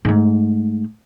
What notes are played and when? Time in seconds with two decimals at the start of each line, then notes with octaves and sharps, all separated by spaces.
0.05 G#2 A3